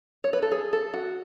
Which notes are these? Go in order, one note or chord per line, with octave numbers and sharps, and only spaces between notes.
C#5
B4
A4
G#4
A4
F#4